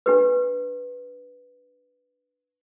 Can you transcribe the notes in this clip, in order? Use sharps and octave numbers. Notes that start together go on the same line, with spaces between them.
D4 G4 B4